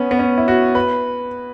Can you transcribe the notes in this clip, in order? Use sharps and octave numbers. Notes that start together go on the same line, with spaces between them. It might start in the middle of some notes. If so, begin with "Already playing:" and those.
Already playing: B3 C#4
B3
C#4
E4
F#4
B4